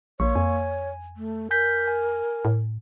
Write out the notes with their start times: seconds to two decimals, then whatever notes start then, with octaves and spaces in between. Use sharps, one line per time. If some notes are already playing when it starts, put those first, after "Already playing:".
0.20 A#1 A#3 C#5 C#6
0.35 F2 G#5
1.17 A3
1.51 A#4 G#5 G6 B6
1.88 G#5
2.45 A2